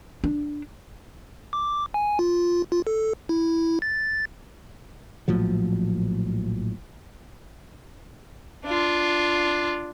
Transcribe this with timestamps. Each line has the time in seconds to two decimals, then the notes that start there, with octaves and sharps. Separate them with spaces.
0.24 D4
1.53 D6
1.94 G#5
2.19 F4
2.72 F4
2.87 A4
3.29 E4
3.82 A6
5.28 A#1 A2 F3 F#3
8.66 D4 F4